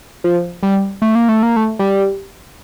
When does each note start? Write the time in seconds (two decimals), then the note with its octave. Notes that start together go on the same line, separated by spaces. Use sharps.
0.24 F3
0.63 G3
1.02 A3
1.15 A#3
1.29 A3
1.43 A#3
1.56 A3
1.79 G3